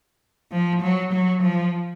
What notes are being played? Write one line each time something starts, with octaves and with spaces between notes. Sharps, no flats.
F3
F#3
F#3
F3